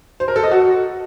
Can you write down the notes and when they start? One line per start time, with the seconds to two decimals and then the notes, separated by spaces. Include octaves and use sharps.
0.20 C5
0.28 A#4
0.36 A4
0.44 D#5
0.51 F#4